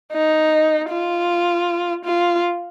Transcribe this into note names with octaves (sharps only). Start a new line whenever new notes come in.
D#4
F4
F4